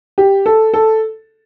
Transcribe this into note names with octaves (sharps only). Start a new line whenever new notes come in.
G4
A4
A4